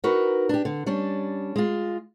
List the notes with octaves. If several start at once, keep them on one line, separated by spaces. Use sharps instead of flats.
D#4 F#4 A#4 B4
D4 G4
D3
G3 C#4 D4
G#3 F4